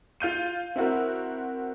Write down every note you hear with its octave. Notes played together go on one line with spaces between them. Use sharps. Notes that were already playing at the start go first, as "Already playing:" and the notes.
F4 F5 G6 D#7
C4 E4 F#4 A#4